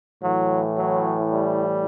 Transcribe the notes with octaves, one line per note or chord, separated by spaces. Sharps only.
A2 E3 F#3
F#3
G3